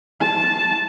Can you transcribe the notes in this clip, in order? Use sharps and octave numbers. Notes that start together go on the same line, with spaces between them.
A5